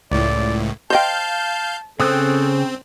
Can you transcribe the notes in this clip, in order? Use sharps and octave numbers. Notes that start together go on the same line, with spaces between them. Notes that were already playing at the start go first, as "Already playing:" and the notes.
C#2 A2 D5
C5 D#5 F5 G5 A5 G6
C#3 C4 A4 D#6 F#6